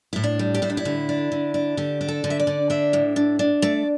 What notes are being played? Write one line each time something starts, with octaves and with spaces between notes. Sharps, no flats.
A2 E4
D4
G3
G4
A2 E4
D4
E4
D3
D4
D3
D4
D3 G4
D4
A4
D3
E5
D5
D3
D4 E5
A2
D4
D4
A3 D5